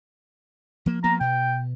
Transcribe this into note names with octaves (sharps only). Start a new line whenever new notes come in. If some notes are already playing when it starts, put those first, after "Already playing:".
F3 A#3
F3 A#3 B3 A#5
B2 G5